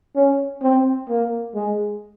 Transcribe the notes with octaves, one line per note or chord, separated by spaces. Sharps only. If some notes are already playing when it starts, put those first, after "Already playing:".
C#4
C4
A#3
G#3